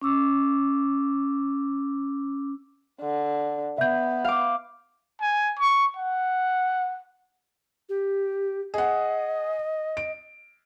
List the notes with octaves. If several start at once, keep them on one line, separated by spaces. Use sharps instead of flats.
C#4 D6 E6
D3
B3 E5 G6
F5 D6
G#5
C#6
F#5
G4
G#4 D#5 F#5
D7